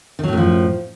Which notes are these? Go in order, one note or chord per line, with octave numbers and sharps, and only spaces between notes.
F#2 A2 D#3 F3 F#3